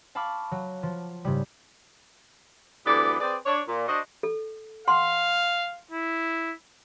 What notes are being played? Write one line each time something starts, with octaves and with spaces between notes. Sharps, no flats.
F5 A5 B5 C#6 D6 F6
F#3
F3
G#2 C#3 G3
D2 D3 E3 B3 G4 D5
C4 G#4 B4 D5
D4 C#5
A#2
D4 F#4 C5 D#5
A4
F5 F#5 C6
E4